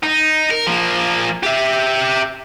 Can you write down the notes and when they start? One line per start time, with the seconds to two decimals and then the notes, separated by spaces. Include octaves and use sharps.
0.04 D#4
0.51 A#4
0.67 F3 A#3
1.43 G4 E5